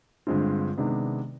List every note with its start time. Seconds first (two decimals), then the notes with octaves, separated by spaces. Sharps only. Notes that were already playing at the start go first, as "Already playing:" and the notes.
0.27 G2 D3 G#3 C4 F4
0.78 C3 D#3 G#3 B3 D4